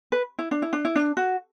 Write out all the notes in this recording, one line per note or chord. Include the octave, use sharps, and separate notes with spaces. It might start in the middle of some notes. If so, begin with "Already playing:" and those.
B4
E4
D4
E4
D4
E4
D4
F#4